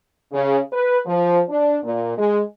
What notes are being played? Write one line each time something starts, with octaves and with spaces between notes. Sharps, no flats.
C#3
B4
F3
D4
A#2
G#3